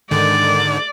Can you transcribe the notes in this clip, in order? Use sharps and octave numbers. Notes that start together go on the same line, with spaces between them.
G#2 D3 D#3 D5